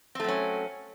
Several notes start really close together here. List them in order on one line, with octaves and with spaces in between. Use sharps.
C4 A3 F#3 C#4